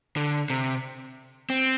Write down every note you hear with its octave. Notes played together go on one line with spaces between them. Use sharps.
D3
C3
C4